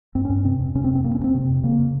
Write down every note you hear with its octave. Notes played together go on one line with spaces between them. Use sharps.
G2 C4
C#4
G2
C3 C4
F2
C3 C#4
C4
F2
C4
G2 A#3
C#4
G2
C4
C3
F2
C#3 A#3